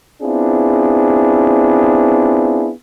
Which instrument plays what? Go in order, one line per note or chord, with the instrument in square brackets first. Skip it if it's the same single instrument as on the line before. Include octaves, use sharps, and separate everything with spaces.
[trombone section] B3 C4 D4 E4 F4 G#4